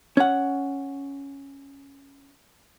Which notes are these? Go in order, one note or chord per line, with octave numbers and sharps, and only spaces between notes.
C#4 F#5